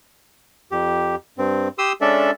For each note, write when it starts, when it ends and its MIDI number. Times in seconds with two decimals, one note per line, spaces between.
0.72 1.15 41
0.72 1.15 67
1.38 1.68 43
1.38 1.68 60
1.78 1.92 67
1.78 1.92 84
1.78 1.92 87
1.78 1.92 88
2.01 2.31 56
2.01 2.31 61
2.01 2.31 62
2.01 2.31 69
2.01 2.31 74
2.01 2.31 76